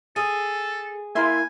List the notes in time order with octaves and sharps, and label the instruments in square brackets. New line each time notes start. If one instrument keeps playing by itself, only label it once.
[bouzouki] G#4 [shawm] A4
[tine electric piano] A#3 E4 A#4 [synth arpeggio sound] E5 C6 [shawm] G#5